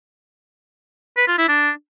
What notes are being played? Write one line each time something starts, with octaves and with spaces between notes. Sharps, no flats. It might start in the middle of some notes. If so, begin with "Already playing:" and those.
B4
F4
E4
D4